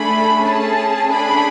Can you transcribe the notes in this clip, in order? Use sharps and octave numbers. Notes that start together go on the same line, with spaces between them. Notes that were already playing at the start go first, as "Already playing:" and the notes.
Already playing: A3 D4 G#4 B5
C#4 G#4 A5
A3 D4 G#4 B5